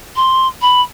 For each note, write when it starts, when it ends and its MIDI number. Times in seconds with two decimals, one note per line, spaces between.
0.16 0.47 84
0.61 0.81 83